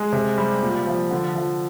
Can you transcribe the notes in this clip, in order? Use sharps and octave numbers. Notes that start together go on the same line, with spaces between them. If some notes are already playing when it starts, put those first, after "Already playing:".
Already playing: G#3
C3
G3
A#2
F3
D3
F3